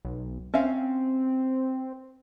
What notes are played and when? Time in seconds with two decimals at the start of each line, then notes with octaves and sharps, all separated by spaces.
0.05 B1
0.54 C4 C#4 E5 F5